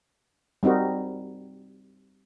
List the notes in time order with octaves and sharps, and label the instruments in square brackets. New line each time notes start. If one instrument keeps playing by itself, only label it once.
[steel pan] G3 C4 D#4 F#4 A#4